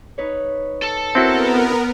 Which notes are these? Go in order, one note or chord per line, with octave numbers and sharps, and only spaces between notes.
D#4 B4 C#5
A4 A5
B3 C4 E4 F#4 A#4